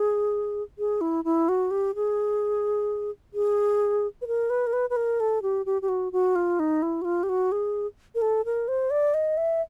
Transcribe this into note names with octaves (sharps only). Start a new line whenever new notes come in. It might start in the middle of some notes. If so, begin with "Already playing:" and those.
Already playing: G#4
G#4
E4
E4
F#4
G4
G#4
G#4
B4
A#4
B4
A#4
B4
B4
A#4
A4
G4
G4
G4
F#4
F#4
F4
D#4
E4
F#4
F4
G4
F#4
G#4
A#4
A4
A#4
C5
D5
D#5
E5